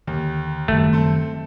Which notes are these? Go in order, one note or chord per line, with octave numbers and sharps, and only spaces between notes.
D#2 D3
F#1 D#3 F#3 G3 A3
C4 A4